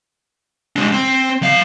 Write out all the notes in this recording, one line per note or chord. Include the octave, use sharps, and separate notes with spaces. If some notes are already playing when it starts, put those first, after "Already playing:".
G#3 D4
C4
F#3 F5